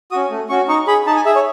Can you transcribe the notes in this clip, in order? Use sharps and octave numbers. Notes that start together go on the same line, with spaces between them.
C#4 F#4 D#6
A3
C#4 F#4 C#6
D#4 C#6
G#4 B5
D#4 A5
G#5
G#4 E5
C#5